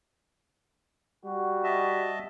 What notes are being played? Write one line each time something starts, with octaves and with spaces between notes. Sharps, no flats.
G3 F#4
D#5 E5 A5